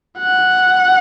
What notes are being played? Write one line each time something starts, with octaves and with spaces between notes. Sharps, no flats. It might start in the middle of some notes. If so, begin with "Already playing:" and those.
F#5